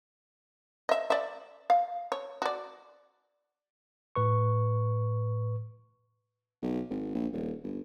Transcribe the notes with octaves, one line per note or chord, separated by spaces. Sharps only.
D#5 E5
D5 E5
F5
C#5
F#4 D5
A2 B4 C#6
B1
G#1
A#1
D#1
G1